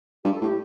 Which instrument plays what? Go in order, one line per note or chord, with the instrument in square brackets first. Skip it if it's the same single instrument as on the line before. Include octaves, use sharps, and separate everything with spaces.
[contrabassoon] G2 [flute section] G4
[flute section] A4
[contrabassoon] A2 [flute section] G4